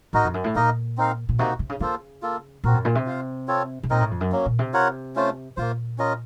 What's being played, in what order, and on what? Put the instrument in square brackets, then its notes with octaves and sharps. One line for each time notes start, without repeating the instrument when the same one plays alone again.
[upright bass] A2 [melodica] D#4 F#4 A#4 D#5
[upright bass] F2
F#2
A2
[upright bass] A#2 [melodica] A#3 D#4 A#4 D#5
[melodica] C4 D#4 A#4 F5
[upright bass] A#2
[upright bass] C3 [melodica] A#3 D#4 F#4
[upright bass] C3
C#3
[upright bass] C#3 [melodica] A#3 F4 A4 C5
[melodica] A#3 F4 A4
[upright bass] A#2 [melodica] C4 F#4 A#4
[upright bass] F#2
A#2
C3
[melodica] F4 C5 F5
C4 F4 A4 C#5
[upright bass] C3
[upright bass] A#2 [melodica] C4 D#4 A#4 D#5
[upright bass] A2
F2
F#2
[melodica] F#3 A#3 C#4
[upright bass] A#2
C3
[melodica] F4 A#4 C#5 F#5
A3 C#4 F4 C5
[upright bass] A#2 [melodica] A#3 F4 C5
[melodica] C#4 F4 A#4 D#5